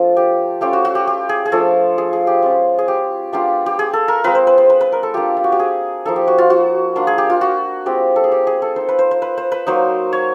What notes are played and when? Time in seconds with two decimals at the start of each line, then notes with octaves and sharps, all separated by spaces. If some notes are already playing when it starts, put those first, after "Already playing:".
Already playing: F3 A3 D4 F4
0.17 G4
0.61 A3 C#4 F4 G4
0.73 F#4
0.85 F#4
0.95 G4
1.07 G4
1.29 G#4
1.46 G#4
1.52 F3 A3 D4 F4 A4
1.98 G#4
2.13 G#4
2.27 G4
2.42 G#3 C#4 F4
2.79 G#4
2.88 G4
3.32 G#3 B3 D4 F4 G4
3.66 G4
3.79 G#4
3.93 A4
4.08 A#4
4.24 G#3 C4 F4 B4
4.35 C5
4.47 B4
4.58 C5
4.70 B4
4.81 B4
4.92 A#4
5.03 A4
5.14 A#3 D4 F4 G4
5.37 F4
5.44 F#4
5.52 G4
5.59 G#4
6.05 F3 A#3 D#4 A4
6.16 G4
6.27 F#4
6.38 F4
6.50 F#4
6.96 A#3 D4 F4
7.07 G#4
7.18 G4
7.30 F4
7.41 F#4
7.86 G#3 C4 F4 G4
8.16 A4
8.24 G#4
8.32 G4
8.47 G#4
8.62 A4
8.76 A#3 D#4 C5
8.89 B4
8.99 C5
9.11 C5
9.22 B4
9.37 C5
9.52 B4
9.67 F#3 A#3 D#4 C5
10.13 C#5